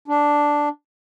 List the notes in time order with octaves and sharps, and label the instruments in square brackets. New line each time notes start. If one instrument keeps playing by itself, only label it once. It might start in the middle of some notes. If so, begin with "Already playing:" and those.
[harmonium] D4